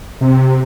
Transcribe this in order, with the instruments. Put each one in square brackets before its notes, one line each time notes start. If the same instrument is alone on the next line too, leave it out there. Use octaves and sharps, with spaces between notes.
[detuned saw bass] C3